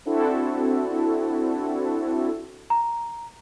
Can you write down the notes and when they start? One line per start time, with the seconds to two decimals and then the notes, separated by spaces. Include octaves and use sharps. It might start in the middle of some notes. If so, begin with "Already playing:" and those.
0.05 C4 D4 E4 F#4 A4
2.70 A#5